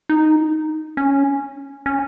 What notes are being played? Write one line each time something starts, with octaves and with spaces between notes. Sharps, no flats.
D#4
C#4
C#4